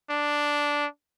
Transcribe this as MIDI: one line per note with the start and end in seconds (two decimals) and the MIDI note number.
0.10 0.86 62